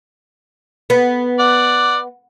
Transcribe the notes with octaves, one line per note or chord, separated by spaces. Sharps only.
B3
D5 F#5